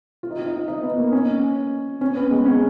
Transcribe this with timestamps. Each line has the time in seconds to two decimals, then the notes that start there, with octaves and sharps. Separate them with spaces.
0.23 F4
0.31 D#4
0.38 F4
0.46 D#4
0.68 D#4
0.83 B3
0.98 A#3
1.12 C#4
2.01 C#4
2.16 B3
2.31 G#3
2.45 C#4